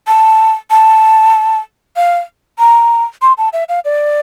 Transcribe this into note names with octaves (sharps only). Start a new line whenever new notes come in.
A5
A5
F5
A#5
C6
A5
E5
F5
D5